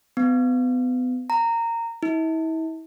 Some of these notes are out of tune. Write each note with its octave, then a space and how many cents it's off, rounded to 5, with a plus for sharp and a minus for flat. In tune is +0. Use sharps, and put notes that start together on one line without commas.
B3 +30
A#5 -15
E4 -40